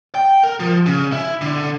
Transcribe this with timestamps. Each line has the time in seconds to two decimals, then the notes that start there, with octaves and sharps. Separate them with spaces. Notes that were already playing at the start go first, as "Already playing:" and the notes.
0.15 G5
0.44 A#4
0.60 F3
0.86 C#3
1.12 E4
1.41 D3